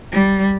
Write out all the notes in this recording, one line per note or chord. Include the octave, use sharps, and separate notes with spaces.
G3